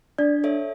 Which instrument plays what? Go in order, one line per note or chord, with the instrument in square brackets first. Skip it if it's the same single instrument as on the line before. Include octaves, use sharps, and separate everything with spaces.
[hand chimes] D4 [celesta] D5
[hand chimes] A4 C#5 E5